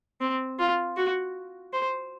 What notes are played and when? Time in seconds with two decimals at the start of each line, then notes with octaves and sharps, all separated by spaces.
0.21 C4
0.59 F4
0.97 F#4
1.73 C5